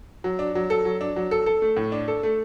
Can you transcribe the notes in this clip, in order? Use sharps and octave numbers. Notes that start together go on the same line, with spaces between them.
F#3
D4
F#3
A4
F#3
D4
F#3
A4
A4
A3
A2
D4
A4
A3